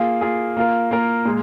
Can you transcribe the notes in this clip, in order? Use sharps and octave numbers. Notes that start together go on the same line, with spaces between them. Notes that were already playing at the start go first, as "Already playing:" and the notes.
Already playing: A#3 F4 G#4
A#3 F4 G#4
A#3 F4 A#4
A#3 F4 A#4
A#2 G#3